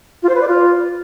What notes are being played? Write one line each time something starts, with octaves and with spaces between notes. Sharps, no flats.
F4
C5
B4
D5
F4